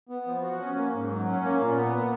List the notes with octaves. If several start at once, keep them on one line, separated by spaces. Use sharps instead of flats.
B3
F3
F#4
C#4
A#3
G#2
F#3
C#4
A#3
A#2
B3
A#2